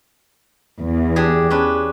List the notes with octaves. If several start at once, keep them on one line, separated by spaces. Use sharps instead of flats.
E2
D4 G4 G#4
C#4 D4 B4